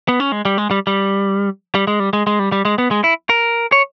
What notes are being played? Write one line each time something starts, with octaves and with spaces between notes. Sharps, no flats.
B3
C#4
G#3
G3
G#3
G3
G3
G3
G#3
G3
G#3
G#3
G3
G3
G#3
B3
G#3
E4
A#4
C#5